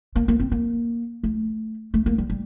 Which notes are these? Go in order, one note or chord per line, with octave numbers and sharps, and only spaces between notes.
A#3
A#3
C4
A#3
A3
A3
A#3
G3
G3